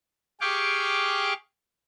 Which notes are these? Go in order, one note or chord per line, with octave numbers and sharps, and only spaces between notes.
G4 G#4 F5 G5 C#6 D6